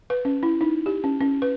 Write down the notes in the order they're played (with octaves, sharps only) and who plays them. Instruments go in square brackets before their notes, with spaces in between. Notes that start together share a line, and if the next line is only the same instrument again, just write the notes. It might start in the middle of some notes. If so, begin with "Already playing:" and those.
[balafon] B4
C#4
E4
D#4
G4
C#4
C#4
B4